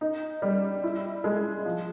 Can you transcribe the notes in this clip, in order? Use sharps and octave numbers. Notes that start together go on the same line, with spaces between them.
D#4
G3
E4
G#3
F3